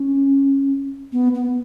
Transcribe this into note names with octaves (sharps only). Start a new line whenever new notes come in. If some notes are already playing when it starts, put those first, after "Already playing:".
Already playing: C#4
B3
B3